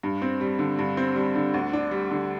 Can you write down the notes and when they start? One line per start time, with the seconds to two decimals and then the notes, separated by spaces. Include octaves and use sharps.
0.03 G2
0.22 C4
0.41 G3
0.59 D3
0.79 G2
0.97 C4
1.16 G3
1.36 D3
1.54 D2
1.73 D4
1.91 G3
2.11 D3